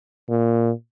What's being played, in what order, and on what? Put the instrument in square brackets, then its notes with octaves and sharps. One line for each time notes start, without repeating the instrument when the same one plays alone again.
[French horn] A#2